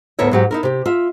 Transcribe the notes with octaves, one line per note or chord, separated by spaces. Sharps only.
D2 A2 B3 A#4 C#5 E5
G#2 F#3 G4
D#4 E4 A#4
C3 G4
F4 E5